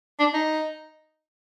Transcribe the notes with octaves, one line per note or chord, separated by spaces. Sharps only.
D4
D#4